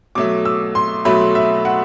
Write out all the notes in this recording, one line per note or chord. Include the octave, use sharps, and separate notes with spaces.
B2 F#3 A3 D6
E6
C6
B2 F#3 A3 B5
E5
F#5